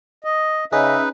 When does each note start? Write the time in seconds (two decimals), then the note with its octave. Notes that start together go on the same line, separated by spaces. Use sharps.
0.25 D#5
0.72 C#3 C#4 D#4 G#4 B4 D#5 E5